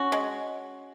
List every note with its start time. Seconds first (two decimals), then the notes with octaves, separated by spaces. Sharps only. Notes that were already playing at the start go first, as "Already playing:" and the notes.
Already playing: C#4 F#4
0.12 G#3